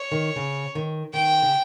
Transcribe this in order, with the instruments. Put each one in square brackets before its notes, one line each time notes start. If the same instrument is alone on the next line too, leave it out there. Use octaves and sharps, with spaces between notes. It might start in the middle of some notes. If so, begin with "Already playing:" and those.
Already playing: [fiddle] C#5
[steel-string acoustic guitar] D#3
C#3
D#3
[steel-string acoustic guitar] D#3 [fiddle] G5
[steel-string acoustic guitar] C#3